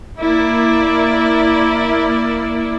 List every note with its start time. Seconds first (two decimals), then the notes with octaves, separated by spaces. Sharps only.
0.18 A#3 E4 D5